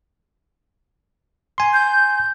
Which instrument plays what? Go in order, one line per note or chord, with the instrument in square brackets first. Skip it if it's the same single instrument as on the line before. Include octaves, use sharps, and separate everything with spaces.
[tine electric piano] G#5 C6
[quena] G6